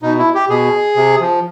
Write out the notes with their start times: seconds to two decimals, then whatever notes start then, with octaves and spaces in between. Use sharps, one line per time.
0.03 B2 D#4
0.18 E4
0.34 G4
0.50 B2 G#4
0.97 C3
1.21 F3